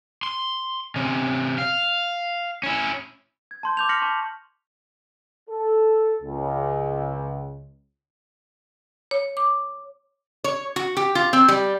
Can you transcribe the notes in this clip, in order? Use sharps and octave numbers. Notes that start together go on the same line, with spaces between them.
C6
C3 C#4
F5
C#4 E4
G#6
A5 C6 G6
D6 G6 F7
F6 A#6 B6 C#7 F#7
A5 C#6 G6
A4
C#2
C#5
D6
C#5
F#4
G4
F4
C4
G3